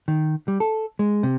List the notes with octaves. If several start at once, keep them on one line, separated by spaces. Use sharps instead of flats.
D#3
G3
A4
G#3
C3